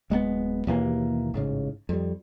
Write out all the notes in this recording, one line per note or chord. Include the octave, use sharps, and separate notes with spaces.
D1 G#3 A#3 B3
D#2 B2 E3 A#3
A1 G#2 C#3
F2 G3